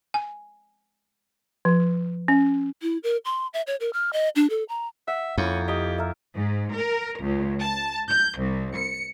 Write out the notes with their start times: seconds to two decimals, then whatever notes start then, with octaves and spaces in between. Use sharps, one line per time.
0.14 G#5
1.65 F3
2.28 C#4
2.82 E4
3.03 A#4
3.25 C6
3.54 E5
3.67 C#5
3.80 A#4
3.93 F6
4.13 D#5
4.36 D4
4.50 A4
4.69 A#5
5.08 E5 F#5
5.38 F2 A#3 C#4 E4
5.68 G4 D#5 F5 D6
5.98 A#4 E5
6.35 G#2
6.74 A#4
7.19 C#2
7.61 A5
8.10 G6
8.41 C2
8.77 C#7